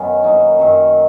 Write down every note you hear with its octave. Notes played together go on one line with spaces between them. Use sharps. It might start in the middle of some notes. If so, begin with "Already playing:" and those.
Already playing: F#2 D#3 F#3 B3 C#4
F#3 A#3 D#4 A#4
F#2 D#3 F#3